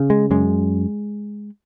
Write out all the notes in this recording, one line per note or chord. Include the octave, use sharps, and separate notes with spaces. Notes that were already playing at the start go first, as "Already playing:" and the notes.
Already playing: C#3
G#3
F#2 G#3